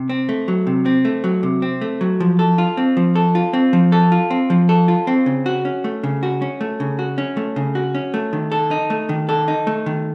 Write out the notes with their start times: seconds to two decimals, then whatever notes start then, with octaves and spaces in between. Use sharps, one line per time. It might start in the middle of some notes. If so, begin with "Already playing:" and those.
Already playing: C3
0.09 C4
0.29 A3
0.48 F#3
0.67 C3
0.86 C4
1.05 A3
1.24 F#3
1.43 C3
1.62 C4
1.81 A3
2.01 F#3
2.20 F3
2.39 A4
2.58 F4
2.77 C4
2.97 F3
3.15 A4
3.35 F4
3.53 C4
3.73 F3
3.92 A4
4.12 F4
4.30 C4
4.50 F3
4.69 A4
4.88 F4
5.07 C4
5.26 C#3
5.46 F#4
5.65 C#4
5.84 A3
6.03 C#3
6.23 F#4
6.42 C#4
6.61 A3
6.80 C#3
6.99 F#4
7.18 C#4
7.37 A3
7.56 C#3
7.75 F#4
7.95 C#4
8.14 A3
8.33 D#3
8.52 A4
8.71 D#4
8.90 A3
9.09 D#3
9.29 A4
9.48 D#4
9.67 A3
9.86 D#3